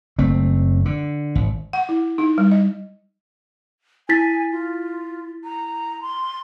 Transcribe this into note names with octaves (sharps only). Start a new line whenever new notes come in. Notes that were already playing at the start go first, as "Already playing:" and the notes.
F#1 A3 C4
D3
G#1
F#5
E4
D#4
G3
D#5
E4 G#5 A6 B6
F4
A#5
C6